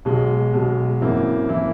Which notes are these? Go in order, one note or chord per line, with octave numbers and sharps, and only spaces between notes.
B1 B2 G#3
B1 B2 G#3
G#1 F#2 E3 A#3 E4
E3 A#3 E4